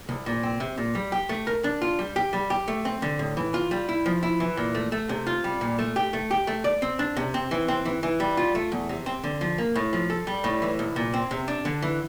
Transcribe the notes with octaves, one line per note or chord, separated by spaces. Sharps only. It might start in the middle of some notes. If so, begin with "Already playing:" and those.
C2
A#2
C4
C3
A#2
G3
G4
A3
A#4
D4
F4
G3
G4
G3
G4
A3
C4
D3
A2
E3
F4
G3
E4
F3
E4
E3
A#2
A3
A3
C3
F4
G3
A#2
A3
G4
A3
G4
A3
D5
C4
D4
C3
C4
E3
C4
E3
E3
G3
F4
A3
E2
C3
C4
D3
F3
A#3
A2
F3
A4
G3
A2
E3
C2
A#2
C4
C3
D4
D3
E3